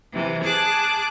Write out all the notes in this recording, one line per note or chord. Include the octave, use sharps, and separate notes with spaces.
C3 E3
G#4 A5 D6 F#6